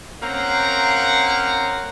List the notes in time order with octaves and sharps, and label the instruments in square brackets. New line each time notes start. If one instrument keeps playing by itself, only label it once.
[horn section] A#3 C4 C#4 F5 F#5 A#5